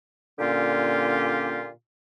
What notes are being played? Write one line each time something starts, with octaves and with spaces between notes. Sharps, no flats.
A#2 D3 A#3 C#4 F4 G4